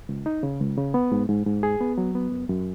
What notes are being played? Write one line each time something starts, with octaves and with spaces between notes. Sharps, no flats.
C#2
D#4
C#3
C#2
C#3
B3
G#2
G#2
G#2
G#4
B3
F#3
B3
F#2
F#2